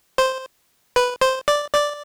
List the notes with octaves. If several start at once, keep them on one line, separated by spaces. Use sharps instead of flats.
C5
B4
C5
D5
D5